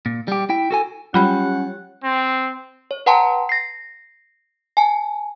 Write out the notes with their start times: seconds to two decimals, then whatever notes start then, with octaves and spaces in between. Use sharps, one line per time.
0.06 A#2
0.28 G3 G4
0.49 E4 G5
0.71 F#4 A4 G#5
1.14 F#3 G3 C#4 F4 G4 F#5 B5
2.04 C4
2.91 C#5
3.06 B4 F#5 G5 A5 A#5 C6
3.49 A#6 C7
4.77 G#5 A5